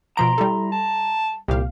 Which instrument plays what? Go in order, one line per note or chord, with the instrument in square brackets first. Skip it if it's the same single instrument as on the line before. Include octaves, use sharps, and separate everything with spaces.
[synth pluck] B2 F3 D7 [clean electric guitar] A#5 C6
[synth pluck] G3 G4 A4 [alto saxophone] E4
[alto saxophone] A5
[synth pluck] C2 A#2 F5 [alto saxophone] G4